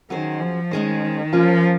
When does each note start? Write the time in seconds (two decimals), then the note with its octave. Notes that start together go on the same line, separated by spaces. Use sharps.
0.10 D#3 F#3 C#4 G#4 C5
0.40 F3
0.71 D#3 G#3 C#4 G#4 C5
1.32 F3 A#3 C#4 F4 A#4